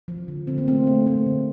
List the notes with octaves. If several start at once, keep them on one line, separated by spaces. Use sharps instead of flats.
F3
D3
D3 C4
A#3
A3 C4
A3
A3 C4
D3